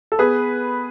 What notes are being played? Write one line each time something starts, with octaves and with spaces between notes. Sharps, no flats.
A4
B3 G#4 B4